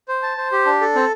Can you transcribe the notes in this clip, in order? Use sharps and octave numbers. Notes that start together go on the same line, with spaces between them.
C5
A5
C5
G4
D4
A4
C4